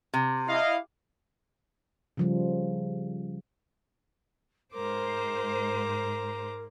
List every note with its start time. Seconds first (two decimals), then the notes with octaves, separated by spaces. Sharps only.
0.14 C3
0.48 E4 D#5 F5
2.17 C#3 F3 G3
4.73 G#2 A#4 C5 A#5 D6